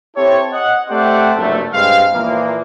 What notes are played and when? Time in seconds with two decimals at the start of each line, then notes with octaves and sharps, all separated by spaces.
0.15 C4 E4 G4 A4 C#5
0.52 D#5 F#5
0.89 A3 C4 G4 C5 D5 F#5
1.35 F#1 G2 C3 A3
1.73 G2 G#3 C4 F5
2.13 A#2 E3 F3 A#3